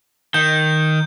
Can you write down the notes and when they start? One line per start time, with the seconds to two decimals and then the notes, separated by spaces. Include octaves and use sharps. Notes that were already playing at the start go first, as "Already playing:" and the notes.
0.34 D#3 G6